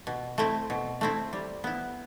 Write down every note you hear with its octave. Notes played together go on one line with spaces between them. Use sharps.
B2
A3 C4 E4
B2
A3 C4 E4
G3
B3 E4